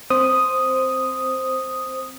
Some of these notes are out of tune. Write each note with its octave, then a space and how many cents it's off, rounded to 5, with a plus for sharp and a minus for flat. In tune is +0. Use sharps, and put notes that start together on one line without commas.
C4 +0 C5 +0 D#6 +0